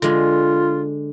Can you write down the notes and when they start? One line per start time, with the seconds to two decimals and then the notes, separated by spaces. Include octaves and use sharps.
0.02 D3 G#3 F4